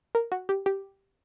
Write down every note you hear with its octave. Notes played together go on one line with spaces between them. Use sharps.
A#4
F#4
G4
G4